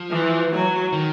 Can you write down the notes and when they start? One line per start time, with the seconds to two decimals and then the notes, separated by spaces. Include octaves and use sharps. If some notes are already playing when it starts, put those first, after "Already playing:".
Already playing: F3
0.11 E3
0.53 F#3
0.93 D#3